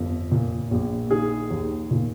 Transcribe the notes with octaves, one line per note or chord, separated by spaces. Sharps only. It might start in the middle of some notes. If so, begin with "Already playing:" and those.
Already playing: G1 F2
A#2
A#1
D#3 G#4
D#2
A#2